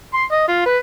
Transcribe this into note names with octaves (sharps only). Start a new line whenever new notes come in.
C6
D#5
F4
B4